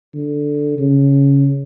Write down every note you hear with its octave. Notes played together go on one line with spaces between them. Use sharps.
D3
C#3